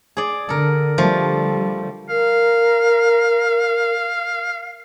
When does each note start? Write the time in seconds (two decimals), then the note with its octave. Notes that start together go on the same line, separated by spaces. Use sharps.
0.17 G#4 D5
0.49 D3 A4 A#4
0.98 D3 F3 G3 A3
2.09 A#4 F5